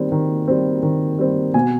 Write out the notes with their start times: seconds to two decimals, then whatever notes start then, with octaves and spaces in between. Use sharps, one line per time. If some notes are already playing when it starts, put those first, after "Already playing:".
Already playing: D#3 G3 C4
0.12 D#3
0.48 G3 C4
0.83 D#3
1.19 G3 C4
1.54 B2 G#5